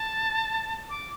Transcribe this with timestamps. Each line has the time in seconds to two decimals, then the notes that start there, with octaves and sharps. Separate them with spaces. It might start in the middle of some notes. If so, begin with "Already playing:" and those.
Already playing: A5
0.90 D6